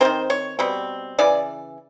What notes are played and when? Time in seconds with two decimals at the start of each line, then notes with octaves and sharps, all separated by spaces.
0.01 G3 C4 C5
0.05 D#3
0.30 C#5
0.59 B2 G3 C4
1.18 C#3 E3 D5